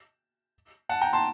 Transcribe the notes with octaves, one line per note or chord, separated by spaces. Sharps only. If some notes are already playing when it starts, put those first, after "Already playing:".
F#5 A5
G5 A#5
A5 C6